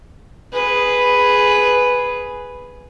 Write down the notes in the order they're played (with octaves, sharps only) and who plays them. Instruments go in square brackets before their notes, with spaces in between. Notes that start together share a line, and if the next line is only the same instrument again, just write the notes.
[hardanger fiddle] G#4 B4